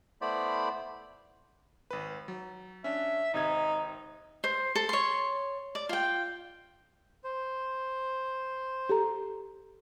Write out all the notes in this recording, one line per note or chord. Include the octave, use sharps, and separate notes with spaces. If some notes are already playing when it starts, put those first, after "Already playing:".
A3 B3 E4 C5 D5 B5
G#1 B4
F#3
C#4 D4 E5
G#1 C3 D#4 G#6
C5
A4
C#5 C6
D5
F4 G5
C5
G4 A4 A#5